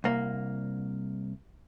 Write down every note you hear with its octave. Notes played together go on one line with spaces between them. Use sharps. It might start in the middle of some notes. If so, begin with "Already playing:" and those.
C2 A#3